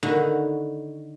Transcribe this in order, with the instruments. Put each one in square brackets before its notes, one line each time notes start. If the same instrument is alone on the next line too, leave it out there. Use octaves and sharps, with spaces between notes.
[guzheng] D3 D#3 D#4 E4 F#4